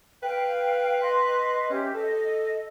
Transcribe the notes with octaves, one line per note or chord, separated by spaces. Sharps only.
B4 F5 G5
D#5 C6
C#4 G4 E5
A4 D#5